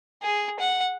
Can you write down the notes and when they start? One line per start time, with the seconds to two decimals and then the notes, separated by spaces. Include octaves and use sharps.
0.23 G#4
0.60 F#5